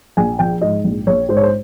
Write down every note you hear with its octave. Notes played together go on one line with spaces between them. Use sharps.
A#1 G#5
F3 G5
G#2 D#5
A#1
A#1 C#5
G#2 C5
C#5
C5